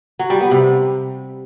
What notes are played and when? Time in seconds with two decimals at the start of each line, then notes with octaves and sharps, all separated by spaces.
0.19 F#3
0.30 G3
0.41 B3
0.51 C3